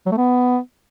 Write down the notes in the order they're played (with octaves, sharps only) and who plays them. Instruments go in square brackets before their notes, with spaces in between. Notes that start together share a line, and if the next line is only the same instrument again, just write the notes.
[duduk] F#3
A3
B3